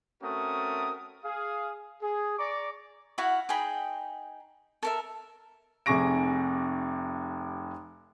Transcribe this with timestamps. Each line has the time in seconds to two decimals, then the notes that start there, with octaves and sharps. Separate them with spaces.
0.22 A3 C4 C#4 F#4 A#4 D#6
1.24 G#4 F5 D#6
2.02 G#4
2.39 D5 A#5 C#6 D6
3.18 E4 F#4 F5 F#5
3.49 D#4 G#4 G5 B5
4.83 A4 A#4 E5
5.86 F1 C3 G#4 C#6 A#6 D7